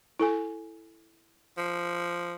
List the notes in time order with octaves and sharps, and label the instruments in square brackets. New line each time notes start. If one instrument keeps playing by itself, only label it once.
[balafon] E4 A4 G#5
[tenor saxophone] F3